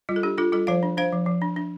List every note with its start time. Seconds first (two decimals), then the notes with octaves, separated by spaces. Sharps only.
0.09 G3 F4
0.16 A4
0.23 D4 G4
0.38 D4 F4 A4
0.52 G3 F4 A4
0.67 F3 C5 F5
0.83 D4
0.97 D4 C5 F5
1.12 F3
1.26 F3
1.42 D4
1.56 D4